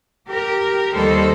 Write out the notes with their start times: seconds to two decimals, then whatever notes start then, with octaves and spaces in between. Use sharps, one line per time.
0.29 G4 A#4
0.94 D#2 D#3 G3 A4 C5